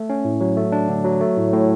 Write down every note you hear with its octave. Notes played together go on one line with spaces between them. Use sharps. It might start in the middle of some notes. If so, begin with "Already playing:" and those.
Already playing: A3
C#4
A2
F#3
A3
D4
D3
F#3
A3
A2
A2